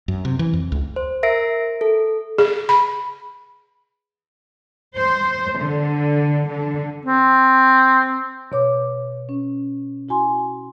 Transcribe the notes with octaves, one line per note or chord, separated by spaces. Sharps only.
F#2
C3
E3
F2
C#2
C5
A#4 E5 A#6 C7 D7
A4
G#4
B5
C5
D3
D3
C4
B2 C#5 D6
C#4
E4 F#4 G#5 C6